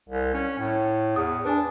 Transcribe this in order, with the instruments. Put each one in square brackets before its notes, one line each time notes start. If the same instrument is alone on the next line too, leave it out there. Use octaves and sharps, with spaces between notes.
[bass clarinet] C2
C#4
A2
[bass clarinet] E2 [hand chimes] D#6
[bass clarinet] D4 [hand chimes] B4 G#5